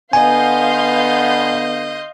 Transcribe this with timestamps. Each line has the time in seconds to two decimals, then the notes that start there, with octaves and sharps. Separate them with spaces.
0.13 D3 B3 D#5 F5 G#5 C6 G6